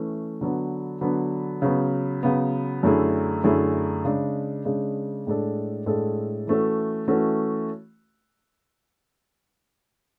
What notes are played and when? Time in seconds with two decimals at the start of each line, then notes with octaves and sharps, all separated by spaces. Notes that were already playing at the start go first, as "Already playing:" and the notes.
Already playing: E3 A3 C#4
0.41 D3 F#3 B3
1.01 D3 F#3 B3
1.62 C#3 F#3 B3
2.23 C#3 F#3 B3
2.83 F#2 D3 A3 E4 G#4
3.44 F#2 D3 A3 E4 G#4
4.05 C#3 G#3 D4
4.65 C#3 G#3 D4
5.27 A2 G#3 D4 A4
5.86 A2 G#3 D4 A4
6.47 E3 A3 C#4 F#4 A4
7.08 E3 A3 C#4 F#4 A4